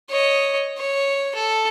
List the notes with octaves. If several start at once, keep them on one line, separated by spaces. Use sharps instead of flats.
C#5 D#5
C#5
A4